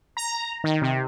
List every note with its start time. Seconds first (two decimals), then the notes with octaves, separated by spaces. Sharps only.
0.17 A#5
0.64 D#3
0.82 C3